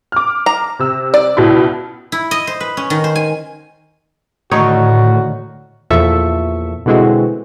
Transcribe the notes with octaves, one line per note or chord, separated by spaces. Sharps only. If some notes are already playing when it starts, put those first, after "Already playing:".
D6 F6
A#5
C3 E6
D5
C#2 B2 E4
E4
D#5
C5
B4
C#4
D#3
C5
G#5
A2 D3 D#3 A3 D#4 F#4 C#5
E2 A#2 F3 A4 E5 C#6
B2 D3 E3 G#3 C4 F#4